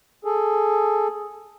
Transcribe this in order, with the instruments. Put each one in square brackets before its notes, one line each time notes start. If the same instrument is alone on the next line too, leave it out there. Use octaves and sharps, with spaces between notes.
[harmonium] G#4 A4